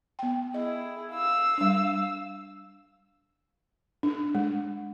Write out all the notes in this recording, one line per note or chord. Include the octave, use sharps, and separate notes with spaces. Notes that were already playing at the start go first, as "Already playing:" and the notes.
B3 G5
E4 G#4 D#5
F5 E6
G3 D4
D4
G#3